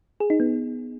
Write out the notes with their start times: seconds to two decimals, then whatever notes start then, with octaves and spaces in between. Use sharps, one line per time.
0.20 G#4
0.30 D#4
0.40 B3